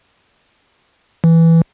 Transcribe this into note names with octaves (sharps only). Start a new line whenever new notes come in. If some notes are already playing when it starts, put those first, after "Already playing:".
E3